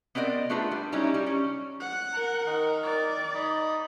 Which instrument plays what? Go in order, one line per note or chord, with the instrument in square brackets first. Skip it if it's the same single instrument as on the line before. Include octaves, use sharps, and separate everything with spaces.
[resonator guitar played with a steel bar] B3 C4 A#4 D5 D#5
A3 D4 F4 G#4 B4
G3
F#3 G3 C#4 D#4 E4 G4
G3
C#4
[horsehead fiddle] F#5
[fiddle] A#4
[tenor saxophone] D#3
[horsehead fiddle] D5
[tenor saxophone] D#4 [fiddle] B5